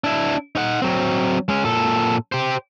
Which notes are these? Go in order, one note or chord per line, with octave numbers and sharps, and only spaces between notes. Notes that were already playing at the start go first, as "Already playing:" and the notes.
D4 E4
D#4 F#5
F#3 C4
G#3 C#4
A#2 A4
G4 C5